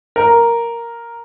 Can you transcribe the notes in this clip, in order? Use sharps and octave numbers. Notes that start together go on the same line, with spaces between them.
A#4